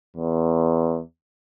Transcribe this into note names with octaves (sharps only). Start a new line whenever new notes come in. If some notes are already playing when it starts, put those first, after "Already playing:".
E2